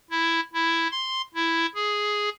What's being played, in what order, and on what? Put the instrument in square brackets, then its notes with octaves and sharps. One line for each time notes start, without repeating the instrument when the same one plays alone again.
[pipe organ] E4
E4
C6
E4
G#4